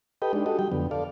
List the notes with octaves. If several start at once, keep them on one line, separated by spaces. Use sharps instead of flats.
G4 A4 B4 D#5 G5
G#3 D4 D#4
F#4 G4 A4 D#5
F#3 G3 G5
F2 D3 B3
A4 D5 F5